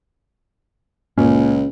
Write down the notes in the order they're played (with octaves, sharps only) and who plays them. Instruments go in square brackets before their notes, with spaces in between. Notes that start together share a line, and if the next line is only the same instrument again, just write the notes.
[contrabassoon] C#2 [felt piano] A#2 [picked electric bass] C#4